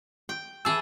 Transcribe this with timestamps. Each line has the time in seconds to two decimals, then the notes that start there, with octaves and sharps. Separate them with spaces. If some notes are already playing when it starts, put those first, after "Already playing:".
0.29 G5
0.65 E3 G#4 A4 E6